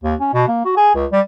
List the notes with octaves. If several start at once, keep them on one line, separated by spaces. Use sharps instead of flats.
D#2
C#4
B2
A#3
F#4
G#4
C#2
G3